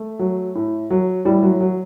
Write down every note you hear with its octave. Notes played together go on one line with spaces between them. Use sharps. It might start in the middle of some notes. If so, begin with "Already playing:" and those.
Already playing: A3
F#3
A2
F#3
A2 G3
F#3
F#3